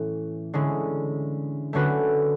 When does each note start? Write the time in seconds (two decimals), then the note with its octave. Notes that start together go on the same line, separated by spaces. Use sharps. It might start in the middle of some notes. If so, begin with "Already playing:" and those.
Already playing: A2 E3 A3 C#4
0.53 D3 G#3 C#4 E4
1.73 D3 A3 C#4 F#4 B4